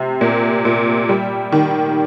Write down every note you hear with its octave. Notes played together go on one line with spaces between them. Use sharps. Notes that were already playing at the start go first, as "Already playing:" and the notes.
Already playing: C3
A#2
A#2
G3
D#3